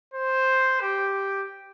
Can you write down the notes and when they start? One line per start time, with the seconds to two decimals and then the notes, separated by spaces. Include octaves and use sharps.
0.14 C5
0.81 G4